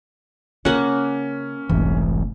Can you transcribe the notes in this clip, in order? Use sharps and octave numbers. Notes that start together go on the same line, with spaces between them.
C#3 A#3 C#4 F#5
F1 B1 G#2 E3